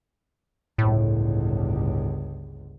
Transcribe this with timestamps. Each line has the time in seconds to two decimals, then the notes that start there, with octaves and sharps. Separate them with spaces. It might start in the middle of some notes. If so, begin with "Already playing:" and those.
0.78 G1 C#2 A2